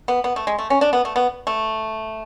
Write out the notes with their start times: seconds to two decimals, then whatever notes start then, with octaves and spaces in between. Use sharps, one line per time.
0.08 B3
0.24 B3
0.36 A3
0.47 G#3
0.59 A3
0.70 C#4
0.81 D4
0.93 B3
1.05 A3
1.16 B3
1.47 A3